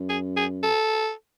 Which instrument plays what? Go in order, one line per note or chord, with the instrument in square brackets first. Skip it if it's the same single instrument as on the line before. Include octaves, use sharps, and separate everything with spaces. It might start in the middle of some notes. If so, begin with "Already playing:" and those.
Already playing: [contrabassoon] F#2
[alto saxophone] G#4
G#4
A4